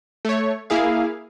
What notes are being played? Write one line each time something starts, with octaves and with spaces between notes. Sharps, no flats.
A3 C#5
A#3 E4 G#4 F5